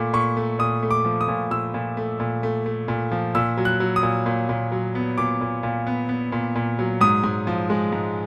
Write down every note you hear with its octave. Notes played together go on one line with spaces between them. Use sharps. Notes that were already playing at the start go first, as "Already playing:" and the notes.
Already playing: A#2 A3 D6
A#2 C#6
A3
A#2 D#6
A3
D6
F3
D#6
A#2
A#2 E6
A#2
A3
A#2
A3
A3
A#2
F3
A#2 E6
F#3
F#6
F#3
D#6
A#2
A#2
A#2
F#3
B3
A#2 D6
A#2
A#2
B3
B3
A#2
A#2
F#3
G#2 D#6
G#2
F3
G#3
G#2